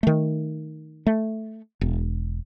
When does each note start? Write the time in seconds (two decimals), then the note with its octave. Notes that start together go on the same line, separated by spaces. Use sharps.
0.03 D#3 A3
1.07 A3
1.81 E1